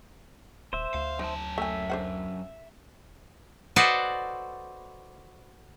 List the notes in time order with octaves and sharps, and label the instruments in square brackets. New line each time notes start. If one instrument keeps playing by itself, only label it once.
[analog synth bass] D#1 [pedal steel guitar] C5 E5
[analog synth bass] D2 [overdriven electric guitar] F5
[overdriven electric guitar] F#2 A5 [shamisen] D#4
[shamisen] A3 G#5 [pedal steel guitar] E5
[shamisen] D3 C5 F#5
[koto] F#4 A4 B4 C5 D5 D#5